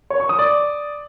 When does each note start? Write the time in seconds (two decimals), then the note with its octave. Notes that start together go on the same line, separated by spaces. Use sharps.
0.10 C#5
0.20 C#6
0.29 D#6
0.39 D5